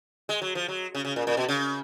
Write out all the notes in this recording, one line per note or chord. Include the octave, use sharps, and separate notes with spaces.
G#3
F#3
F3
F#3
C#3
C#3
A#2
A#2
B2
C#3